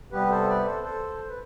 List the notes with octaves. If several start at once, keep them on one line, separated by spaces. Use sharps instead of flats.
C3 G3 B3 G4 B4
A4 C5
B4 D5
A4 C5
A4 C5
C5
B4